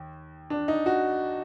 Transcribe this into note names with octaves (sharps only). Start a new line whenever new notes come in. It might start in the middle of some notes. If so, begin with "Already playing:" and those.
Already playing: D#2
D4
D#4
F#4